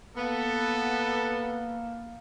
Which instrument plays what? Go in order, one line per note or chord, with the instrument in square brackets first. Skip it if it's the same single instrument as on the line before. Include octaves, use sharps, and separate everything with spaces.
[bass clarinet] A#3 [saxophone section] B3 [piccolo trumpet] A4